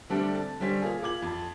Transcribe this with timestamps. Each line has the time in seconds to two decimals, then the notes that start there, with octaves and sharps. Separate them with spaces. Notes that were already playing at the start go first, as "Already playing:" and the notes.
0.10 D3 G3 A3 C4 D4 G4
0.35 A5
0.60 D3 G3 C#4 C5 B6
0.82 A#3 F4 G#4
1.02 F4 D6 G#6 F#7
1.22 F2 A5